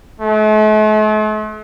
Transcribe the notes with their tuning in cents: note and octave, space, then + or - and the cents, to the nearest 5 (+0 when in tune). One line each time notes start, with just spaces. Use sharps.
A3 -45